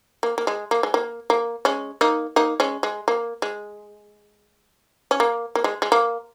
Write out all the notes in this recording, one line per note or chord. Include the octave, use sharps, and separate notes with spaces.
A#3
A#3
G#3
A#3
G#3
A#3
A#3
G#3 C#4
A#3 D#4
A#3 D#4
G#3 C#4
G#3
A#3
G#3
C#4
A#3
A#3
G#3
G#3
A#3